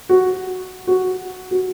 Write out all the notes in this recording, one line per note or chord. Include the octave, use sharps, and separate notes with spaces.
F#4
F#4
F#4